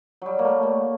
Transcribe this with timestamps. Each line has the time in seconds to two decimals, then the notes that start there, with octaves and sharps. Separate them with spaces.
0.22 F#3 G3
0.39 A#3
0.44 A3
0.63 A#3